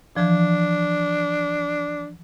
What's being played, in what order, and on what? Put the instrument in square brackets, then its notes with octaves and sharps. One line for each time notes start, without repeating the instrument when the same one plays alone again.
[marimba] E3 F3 [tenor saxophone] D4